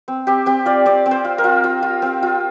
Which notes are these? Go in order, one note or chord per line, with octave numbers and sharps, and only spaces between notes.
C4
C4 G4
C4 G4
F4 D5
C4 D5
C4
C5
F4
A#4
F4
F4
F4
C4
F4